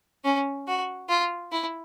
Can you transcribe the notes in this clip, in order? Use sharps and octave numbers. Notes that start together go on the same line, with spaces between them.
C#4
F#4
F4
E4